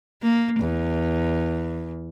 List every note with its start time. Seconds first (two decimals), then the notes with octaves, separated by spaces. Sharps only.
0.22 A#3
0.61 E2